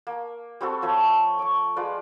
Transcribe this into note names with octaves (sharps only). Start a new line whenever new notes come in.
A#3
G3 C4 F#4 A4
F3 A3 C#5 C#6
C#6 D6
G#3 F4 B4 D5